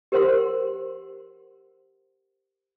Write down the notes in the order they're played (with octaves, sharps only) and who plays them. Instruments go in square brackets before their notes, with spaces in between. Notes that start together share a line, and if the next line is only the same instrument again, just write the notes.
[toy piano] G4 A#4 C5 F#5 C6